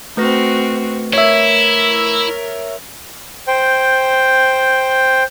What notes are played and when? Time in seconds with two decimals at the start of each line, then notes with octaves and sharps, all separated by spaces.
0.17 A3 C4 F#4 B4 A#6
1.13 E4 A#4 C#5 E5
3.48 C5 G5